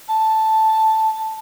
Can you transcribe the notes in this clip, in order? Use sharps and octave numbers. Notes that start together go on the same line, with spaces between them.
A5